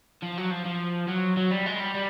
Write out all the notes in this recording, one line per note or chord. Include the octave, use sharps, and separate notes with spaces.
F3
F#3
F3
F3
F#3
F#3
G3
G#3
G3
G3